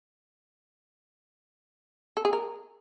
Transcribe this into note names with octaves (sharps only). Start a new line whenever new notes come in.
A4
G#4
A#4